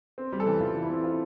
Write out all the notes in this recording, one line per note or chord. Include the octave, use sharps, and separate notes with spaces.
C4
G3
A4
E3
E3 F4
E3
E4
C4
C4 F4